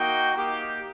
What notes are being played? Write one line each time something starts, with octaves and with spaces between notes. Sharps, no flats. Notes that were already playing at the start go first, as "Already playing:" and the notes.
Already playing: A#3 D#4 F#4 G5
A#3 D#4 G4